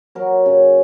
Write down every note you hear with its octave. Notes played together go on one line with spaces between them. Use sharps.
F#3 A#4
C#3